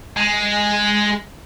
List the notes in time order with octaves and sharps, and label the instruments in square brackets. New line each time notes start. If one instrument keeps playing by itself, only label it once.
[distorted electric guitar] G#3